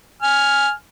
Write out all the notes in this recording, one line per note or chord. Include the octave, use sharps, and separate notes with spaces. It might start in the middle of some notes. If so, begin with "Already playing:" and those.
G#5 F6